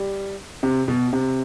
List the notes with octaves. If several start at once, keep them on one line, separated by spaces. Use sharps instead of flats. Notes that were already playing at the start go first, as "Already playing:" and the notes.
Already playing: G3
C3
B2
C3